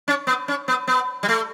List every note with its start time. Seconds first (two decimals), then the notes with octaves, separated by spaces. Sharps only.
0.08 C#4
0.27 B3
0.48 C#4
0.68 B3
0.88 B3
1.23 G3
1.28 A3